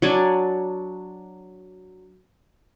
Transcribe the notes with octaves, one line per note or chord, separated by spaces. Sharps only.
F#3 D4 D5 G#5